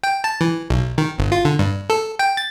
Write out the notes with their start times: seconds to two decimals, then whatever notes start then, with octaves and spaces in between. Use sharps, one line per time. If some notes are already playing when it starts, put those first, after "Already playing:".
0.03 G5
0.24 A5
0.41 E3
0.70 B1
0.98 D#3
1.18 G1
1.32 F4
1.45 D3
1.59 G2
1.90 A4
2.19 G5
2.37 A6